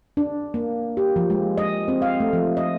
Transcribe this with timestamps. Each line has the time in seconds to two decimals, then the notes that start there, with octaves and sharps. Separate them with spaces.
0.17 D4
0.54 A#3
0.97 G4
1.16 F3
1.30 G#3
1.58 D#5
1.88 C4
2.02 F5
2.20 A3
2.33 F3
2.57 D#5